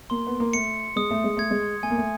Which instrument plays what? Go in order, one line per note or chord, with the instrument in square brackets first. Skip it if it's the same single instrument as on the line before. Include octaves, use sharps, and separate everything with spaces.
[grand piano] A#3 [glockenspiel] C6
[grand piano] B3
A#3
[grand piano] A3 [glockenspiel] C#7
[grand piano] G#3 [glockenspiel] D#6
[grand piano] A3
G#3
[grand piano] A3 [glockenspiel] G#6
[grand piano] G#3
[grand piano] A3 [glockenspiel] G#5
[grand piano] A#3
A3